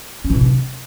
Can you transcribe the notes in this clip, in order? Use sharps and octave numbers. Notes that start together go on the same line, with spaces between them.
C#4
E3
C3
D4